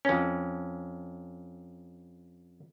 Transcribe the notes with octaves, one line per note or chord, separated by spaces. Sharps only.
F2 C#4